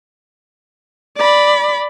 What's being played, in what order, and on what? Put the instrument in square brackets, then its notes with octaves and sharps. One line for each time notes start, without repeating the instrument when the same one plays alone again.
[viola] D5 B5